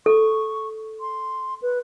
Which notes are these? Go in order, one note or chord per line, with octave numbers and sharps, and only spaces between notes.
A4 C#6
C6
B4